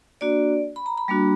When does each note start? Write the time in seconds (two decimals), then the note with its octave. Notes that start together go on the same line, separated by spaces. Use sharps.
0.21 A#3 D4 F#4 D5
0.76 B5
0.86 A#5
0.98 B5
1.08 G3 A#3 D4 F#4